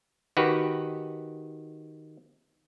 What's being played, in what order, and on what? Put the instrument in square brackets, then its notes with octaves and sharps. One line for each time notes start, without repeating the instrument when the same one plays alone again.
[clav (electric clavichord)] D#3 F#4 G4 B4